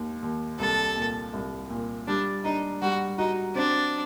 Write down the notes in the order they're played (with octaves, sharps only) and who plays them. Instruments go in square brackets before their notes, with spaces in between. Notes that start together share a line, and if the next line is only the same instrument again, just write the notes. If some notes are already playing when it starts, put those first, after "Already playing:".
Already playing: [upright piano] D#2 D#3
D#2
[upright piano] C2 [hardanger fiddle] A4
[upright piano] A#2
C2
A#2
[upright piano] G3 [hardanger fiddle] D4
[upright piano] D4 [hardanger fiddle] D#4
[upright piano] G3 [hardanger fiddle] F#4
[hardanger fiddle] D#4 [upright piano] F#4
[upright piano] C4 [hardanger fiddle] D4